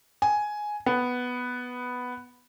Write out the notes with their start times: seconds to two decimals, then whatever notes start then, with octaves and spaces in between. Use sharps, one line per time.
0.22 G#5
0.86 B3